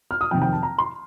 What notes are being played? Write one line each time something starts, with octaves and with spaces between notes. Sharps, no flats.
F6
D#6
F2 C3 D#3 G5
G5
A5
A#5
C6